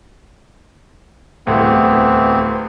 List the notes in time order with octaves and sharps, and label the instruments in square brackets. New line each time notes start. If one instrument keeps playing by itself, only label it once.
[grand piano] D1 C2 A2 [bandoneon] E3 B3 C4